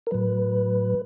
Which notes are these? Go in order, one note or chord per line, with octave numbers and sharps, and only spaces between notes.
A#4
A2 F#3 B4